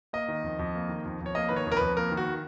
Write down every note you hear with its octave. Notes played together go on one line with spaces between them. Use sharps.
A#3 D#5
D#3
F2
F2
A#3
D#3
F2
F2 C#5
A#3 D#5
D#3 B4
C#5
F2 A#4
F2 B4
A#3 A#4
D#3
F#4